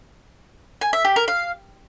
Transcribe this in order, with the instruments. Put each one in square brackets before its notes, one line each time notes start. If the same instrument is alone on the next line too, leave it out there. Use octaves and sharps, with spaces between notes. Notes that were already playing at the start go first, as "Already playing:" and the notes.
[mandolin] G#5
E5
G4
A#4
F5